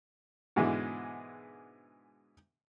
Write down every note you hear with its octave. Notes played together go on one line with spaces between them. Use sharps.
G#2 B2 D3 E3 G#3